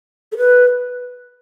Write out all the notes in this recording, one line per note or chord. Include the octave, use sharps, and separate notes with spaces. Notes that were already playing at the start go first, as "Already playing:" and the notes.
A4
B4